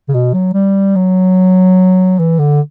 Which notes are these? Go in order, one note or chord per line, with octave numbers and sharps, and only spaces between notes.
C#3
B2
F#3
G3
F#3
E3
D3